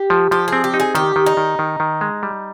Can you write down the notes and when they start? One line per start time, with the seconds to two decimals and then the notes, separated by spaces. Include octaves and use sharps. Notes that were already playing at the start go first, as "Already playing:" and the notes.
Already playing: G4
0.10 F3
0.31 F3 G4
0.48 C4 G#4
0.64 G4
0.74 D#4
0.80 G#4
0.95 D#3 G4
1.16 D#3
1.26 D#4
1.37 D#3
1.59 D#3
1.80 D#3
2.01 G#3
2.23 G3